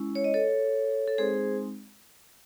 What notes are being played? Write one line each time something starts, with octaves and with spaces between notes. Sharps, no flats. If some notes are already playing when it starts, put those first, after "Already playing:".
Already playing: G#3 C#4 E4
C#5
D#5
A4 C#5
A4
G#3 C4 D#4 G#4 C5